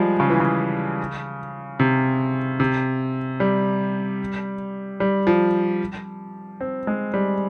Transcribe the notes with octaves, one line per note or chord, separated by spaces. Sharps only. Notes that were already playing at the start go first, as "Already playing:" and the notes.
Already playing: F3 G3 G#3
C#3
E3
C#3
C3
C3
G3
G3
F3
C4
G#3
G3